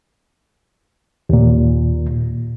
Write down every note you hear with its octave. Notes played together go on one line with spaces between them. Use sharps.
D#2 A#2